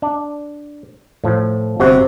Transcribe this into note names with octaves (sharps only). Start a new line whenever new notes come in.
D4
A2 F3
G1 C3 F#4